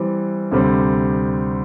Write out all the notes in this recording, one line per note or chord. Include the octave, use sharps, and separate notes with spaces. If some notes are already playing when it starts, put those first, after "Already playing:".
Already playing: E3 G3 C4
D2 C3 G3 C4